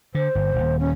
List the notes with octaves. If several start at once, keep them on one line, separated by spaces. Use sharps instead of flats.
D3 C5
G1
D#1 D#2
C#4